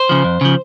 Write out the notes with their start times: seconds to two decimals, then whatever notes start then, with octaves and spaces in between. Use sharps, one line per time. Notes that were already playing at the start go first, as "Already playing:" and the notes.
Already playing: C5
0.09 C#3 F3
0.24 F2
0.41 C#3 F3